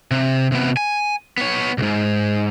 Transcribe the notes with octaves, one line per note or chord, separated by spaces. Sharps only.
C3
C3 B3
G#5
B3 C#5
C2 G#2